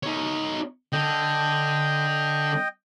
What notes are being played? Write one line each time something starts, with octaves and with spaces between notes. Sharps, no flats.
D#4 C#5
D3 D#5 G5